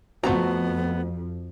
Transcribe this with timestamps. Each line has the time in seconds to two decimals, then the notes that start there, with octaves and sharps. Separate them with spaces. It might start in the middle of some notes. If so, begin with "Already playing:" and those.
0.24 F2 A3 B3 C4 F#4 A#5